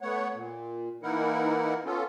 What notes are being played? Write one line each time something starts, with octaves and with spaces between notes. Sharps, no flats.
A3 B3 C#5 F#5
A#2
E3 A#3 D#4 E4 A#4 F#5
B3 C#4 F4 A4